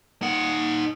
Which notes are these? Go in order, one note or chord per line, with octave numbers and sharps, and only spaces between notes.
D#4 F#5